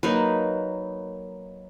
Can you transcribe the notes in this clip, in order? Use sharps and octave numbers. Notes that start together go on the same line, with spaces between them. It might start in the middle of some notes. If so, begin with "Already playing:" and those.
F#3 A#3 D#4 B4